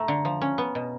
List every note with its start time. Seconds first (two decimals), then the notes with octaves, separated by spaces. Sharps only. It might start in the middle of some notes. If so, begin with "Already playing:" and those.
Already playing: A3 A#5
0.08 D3
0.25 F3
0.41 C#4
0.58 B3
0.75 B2